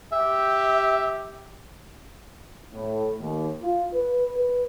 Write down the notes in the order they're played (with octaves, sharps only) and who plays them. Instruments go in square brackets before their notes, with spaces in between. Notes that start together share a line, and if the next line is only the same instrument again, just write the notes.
[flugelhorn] G4 [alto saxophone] E5
[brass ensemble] A2
D#2
F4
B4
B4